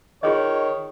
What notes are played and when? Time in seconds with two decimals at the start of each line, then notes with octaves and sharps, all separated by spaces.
0.23 D#3 F4 G#4 C#5 D#5